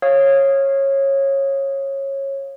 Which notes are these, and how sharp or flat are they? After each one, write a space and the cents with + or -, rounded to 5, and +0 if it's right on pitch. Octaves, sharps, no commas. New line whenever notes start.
C#5 -20 F5 -10 D#6 +0